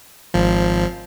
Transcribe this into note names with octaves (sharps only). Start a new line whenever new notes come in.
G#1 F3